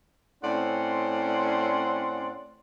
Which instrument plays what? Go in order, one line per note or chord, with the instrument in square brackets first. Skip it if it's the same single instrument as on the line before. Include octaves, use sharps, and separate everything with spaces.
[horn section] A2 C4 C#4 D5 F#5 C6